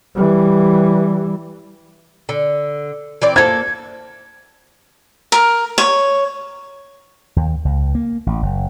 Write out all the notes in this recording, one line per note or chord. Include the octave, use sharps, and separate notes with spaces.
E3 G3
D3
E3 C4 D5
A#3 A4 C5 G#6
A#4
C#5
D#2
C#2
A#3
A1
F#1